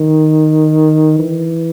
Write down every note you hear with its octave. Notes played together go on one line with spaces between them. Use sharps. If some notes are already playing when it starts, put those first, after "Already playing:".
Already playing: D#3
E3